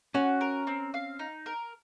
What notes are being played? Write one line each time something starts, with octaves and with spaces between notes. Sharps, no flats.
C#4 F#4
A#4
C4
F5
D#4
A#4